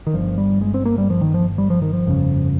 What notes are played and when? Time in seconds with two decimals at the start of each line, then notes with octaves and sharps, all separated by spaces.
0.07 D#3
0.14 G1 G2 F3
0.38 G3
0.61 G#3
0.74 C4
0.85 A#3
0.98 G3
1.10 F3
1.21 D#3
1.34 F3
1.58 G3
1.70 F3
1.82 D#3
1.93 F3
2.06 G1 F2 C#3